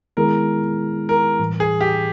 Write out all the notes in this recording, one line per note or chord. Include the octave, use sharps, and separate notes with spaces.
D#3 G#3 B3 E4 G#4 A#4
A#4
A2 E3 G3
G#4
G4